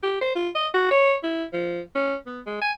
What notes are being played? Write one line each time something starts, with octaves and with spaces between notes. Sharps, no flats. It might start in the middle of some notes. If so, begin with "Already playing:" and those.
G4
C5
F4
D#5
F#4
C#5
E4
F3
C#4
B3
G#3
G#5